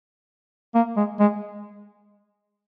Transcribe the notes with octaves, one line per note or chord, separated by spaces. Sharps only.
A#3
G#3
G#3